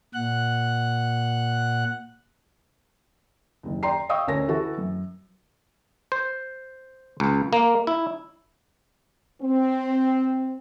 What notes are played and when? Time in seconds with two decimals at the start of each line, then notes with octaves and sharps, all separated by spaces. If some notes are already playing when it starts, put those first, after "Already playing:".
0.14 A#2 F#5 F#6
3.63 F#1 D#2
3.83 D5 G5 A#5 C6 C7
4.09 D#5 F5 G5 C#6 D#6 E6
4.27 D2 C#4 A#4 C#5 A#6
4.48 E3 F#4 A4
4.77 F#2
6.12 C5
7.20 C#2
7.53 A#3
7.87 E4
9.42 C4